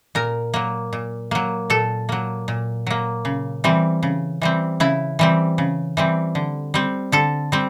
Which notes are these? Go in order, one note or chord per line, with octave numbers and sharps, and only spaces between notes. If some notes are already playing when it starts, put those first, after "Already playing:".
A#2 A#4
F#3 A#3
A#2
F#3 A#3
A#2 A4
F#3 A#3
A#2
F#3 A#3
C#3
E3 G3 C4
C#3
E3 G3 C4
C#3 E4
E3 G3 C4
C#3
E3 G3 C4
D3
G3 C4
D3 A4
G3 C4